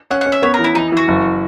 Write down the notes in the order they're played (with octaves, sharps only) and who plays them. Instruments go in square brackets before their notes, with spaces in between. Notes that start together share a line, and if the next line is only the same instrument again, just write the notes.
[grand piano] C#4 [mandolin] F#5
[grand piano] C#4 [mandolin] F#5
[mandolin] E5
[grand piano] B3 [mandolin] C#5
[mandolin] A#4
[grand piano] E3
[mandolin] E4
[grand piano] E3 [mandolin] D#4
[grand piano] E3 [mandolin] F#4
[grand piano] F#1